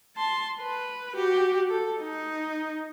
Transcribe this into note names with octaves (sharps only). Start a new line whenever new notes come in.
A5 C6
B4
F#4 G4
A4
D#4